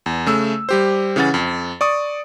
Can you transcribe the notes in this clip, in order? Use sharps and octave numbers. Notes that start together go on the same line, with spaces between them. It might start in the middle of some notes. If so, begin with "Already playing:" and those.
E2
C#3 A3 E6
G3 G4 C5
C#3 E3 C#4 F#5 A6
F2
D5 C#6 D#6